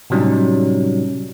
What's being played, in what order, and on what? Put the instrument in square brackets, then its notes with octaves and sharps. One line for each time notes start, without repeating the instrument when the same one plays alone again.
[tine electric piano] A2 C3 F#3 G3 C#4 D#4